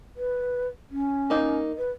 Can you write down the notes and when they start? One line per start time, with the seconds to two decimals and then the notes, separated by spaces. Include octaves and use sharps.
0.17 B4
0.91 C#4
1.30 A#3 D#4
1.78 B4